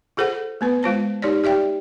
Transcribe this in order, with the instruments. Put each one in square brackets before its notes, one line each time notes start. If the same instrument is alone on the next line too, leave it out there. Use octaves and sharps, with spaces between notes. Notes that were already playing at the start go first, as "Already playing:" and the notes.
[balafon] F4 G#4 A4 C5 F#5
A3 B3 B4
G#3 F4 C5 A5
D#4 G4 C#5 D5
G4 D5 E5 G5